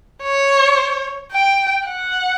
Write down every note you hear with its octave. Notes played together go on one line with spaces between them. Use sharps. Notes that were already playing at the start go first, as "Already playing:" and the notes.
C#5
G5
F#5